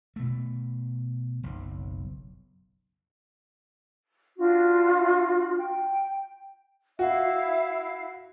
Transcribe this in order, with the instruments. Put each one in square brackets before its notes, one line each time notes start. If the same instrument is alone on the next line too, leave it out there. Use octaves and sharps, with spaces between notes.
[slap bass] B2 A3
F#1 B1
[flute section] D4 F4 F#4
G5
[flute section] E4 F5 [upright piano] F#4 [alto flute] E5